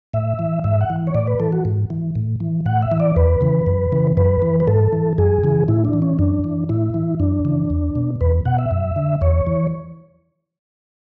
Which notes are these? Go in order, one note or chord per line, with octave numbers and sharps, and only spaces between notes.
A2 E5
E3
G#2 E5
F#5
E3
C#5
A2 D5
B4
E3 A4
F#4
G#2
E3
A2
E3
A2 F#5
E5
E3
D5
E2 B4
C#3 E3
F#2
C#3 E3
F#2 B4
E3
B4
G#2 A4
E3
F#2 G#4
C#3 E3
A2 E4
D4
E3
C#4
F#2 D4
E3
A2 E4
E3
F#2 D4
C#3 E3
E2
B2
E2 B4
B2 F#5
E5
F#2
D3
E2 C#5
E3